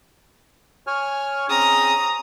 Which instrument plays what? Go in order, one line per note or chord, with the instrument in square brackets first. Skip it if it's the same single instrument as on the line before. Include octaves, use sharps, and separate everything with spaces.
[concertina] C#5 G#5 F6
[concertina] C4 C#4 G#4 [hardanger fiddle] A#5 D#6